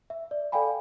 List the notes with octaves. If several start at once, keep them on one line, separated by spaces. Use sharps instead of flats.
E5
D5
A4 D5 F5 G5 G#5 B5